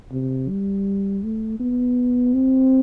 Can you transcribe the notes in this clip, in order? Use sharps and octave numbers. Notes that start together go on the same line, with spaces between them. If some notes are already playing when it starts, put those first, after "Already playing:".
C3
G3
A3
B3
C4